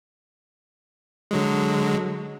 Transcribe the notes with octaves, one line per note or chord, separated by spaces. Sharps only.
D3 F#3 G#3